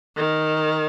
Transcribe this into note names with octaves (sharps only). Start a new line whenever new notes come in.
D#3